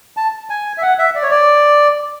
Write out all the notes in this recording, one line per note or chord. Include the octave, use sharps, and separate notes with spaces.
A5
G#5
E5
F#5
E5
D5
C#5
D5